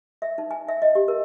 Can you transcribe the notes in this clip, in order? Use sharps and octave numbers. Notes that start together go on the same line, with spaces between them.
E5
D#4
G#5
E5
D#5
G4
A#4